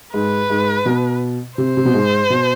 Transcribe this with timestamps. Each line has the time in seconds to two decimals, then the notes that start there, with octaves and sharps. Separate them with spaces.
0.14 G#2 B4
0.50 G#2
0.85 B2
1.57 C3 C5
1.77 C3
1.85 B2
1.94 G#2
2.30 B2